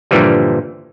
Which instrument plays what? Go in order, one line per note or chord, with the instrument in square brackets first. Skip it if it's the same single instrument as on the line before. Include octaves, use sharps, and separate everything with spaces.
[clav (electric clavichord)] G2 A#2 D3 E3 F3 G3